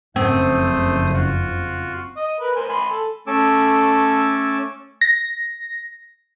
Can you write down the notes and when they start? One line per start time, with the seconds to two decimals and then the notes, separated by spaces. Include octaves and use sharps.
0.16 F#1 F2 A3 C4 C5 D#6
1.13 F4 F#4
2.17 D#5
2.40 A#4 B4
2.56 A#4 C5 G#5
2.69 G#5 B5 C6
2.91 A4
3.27 A3 C#4 A4 G#5 D6 E6
5.01 A#6